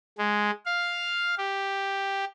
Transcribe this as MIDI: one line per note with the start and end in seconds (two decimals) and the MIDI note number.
0.18 0.51 56
0.66 1.35 77
1.38 2.25 67